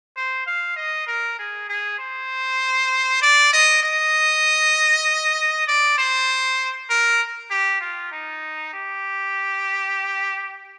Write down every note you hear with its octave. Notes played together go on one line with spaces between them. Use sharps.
C5
F5
D#5
A#4
G#4
G#4
C5
D5
D#5
D#5
D5
C5
A#4
G4
F4
D#4
G4